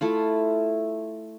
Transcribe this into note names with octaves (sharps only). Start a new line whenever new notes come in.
A3 E4 F4